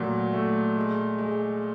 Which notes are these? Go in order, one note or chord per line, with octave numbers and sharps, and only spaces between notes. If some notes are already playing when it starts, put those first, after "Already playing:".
Already playing: A#2 F#3 A3
A3
G#3
G#3